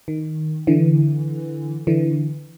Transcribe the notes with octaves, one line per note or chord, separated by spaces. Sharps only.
D#3
D3 E3
D3 E3